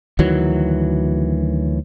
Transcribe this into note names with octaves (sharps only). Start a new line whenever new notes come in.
D2 D#3 E3 F#3